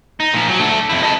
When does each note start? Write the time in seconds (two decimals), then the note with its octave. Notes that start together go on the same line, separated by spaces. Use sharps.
0.20 D#4
0.34 A#2 F3
0.48 F#3
0.60 A3 D4
0.90 F2 E4
1.03 D#5 A5